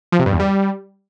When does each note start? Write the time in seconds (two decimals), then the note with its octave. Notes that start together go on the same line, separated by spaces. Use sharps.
0.12 F3
0.19 C3
0.26 G2
0.33 E2
0.40 G3